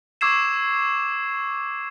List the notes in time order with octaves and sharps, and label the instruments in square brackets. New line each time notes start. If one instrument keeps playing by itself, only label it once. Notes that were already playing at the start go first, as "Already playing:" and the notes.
[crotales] C#6 D6 E6 G#6 C7 E7